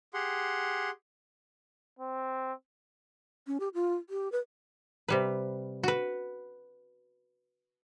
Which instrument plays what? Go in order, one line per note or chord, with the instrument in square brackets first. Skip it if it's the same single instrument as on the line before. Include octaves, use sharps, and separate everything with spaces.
[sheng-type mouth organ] G4 G#4 F#5 C6
[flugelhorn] C4
[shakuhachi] C#4
G4
F4
G4
B4
[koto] C3 G3 B4
F#4 B4